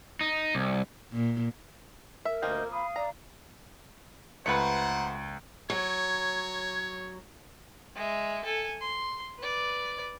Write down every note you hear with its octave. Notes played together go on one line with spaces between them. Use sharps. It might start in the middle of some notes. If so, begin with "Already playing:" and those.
D#4
C2
A#2
A#4 E5
D2 F3 A#3 C4 D#5 G6
F5 B5 D#6
D5 A#5
C#2 A3 B4 C5 F#5 A#5 C#7
F#3 C#5 G#6
G#3 E5
A4 G#5
C6
B4 D5